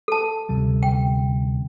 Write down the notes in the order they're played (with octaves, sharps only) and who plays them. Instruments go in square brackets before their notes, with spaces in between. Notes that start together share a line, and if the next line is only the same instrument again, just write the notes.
[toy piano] A4 A5
[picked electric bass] D2 C3 G3
[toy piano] G5